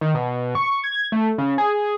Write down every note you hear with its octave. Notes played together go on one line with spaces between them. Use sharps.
D#3
B2
C#6
G#6
A3
C#3
G#4